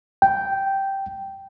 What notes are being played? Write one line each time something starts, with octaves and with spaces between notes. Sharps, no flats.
G5